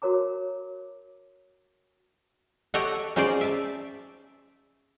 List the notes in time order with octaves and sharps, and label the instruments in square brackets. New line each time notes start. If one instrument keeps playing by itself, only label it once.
[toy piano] F#4 A#4 C#5 A#5 D6
[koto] G4 A4 C#5 D#5 E5 F#5
C#4 D#4 G#4 C5 D5
E5 A5